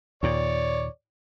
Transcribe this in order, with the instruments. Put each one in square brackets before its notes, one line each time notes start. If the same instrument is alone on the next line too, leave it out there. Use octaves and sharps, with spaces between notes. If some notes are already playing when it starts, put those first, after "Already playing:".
[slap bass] D#2 A#2 [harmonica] C#5 D5